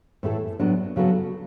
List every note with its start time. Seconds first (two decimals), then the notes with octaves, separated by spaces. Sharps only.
0.23 A2 E3 A3 E4 A4
0.60 A2 F#3 B3 D4
0.96 C#3 F#3 B3 F#4 A4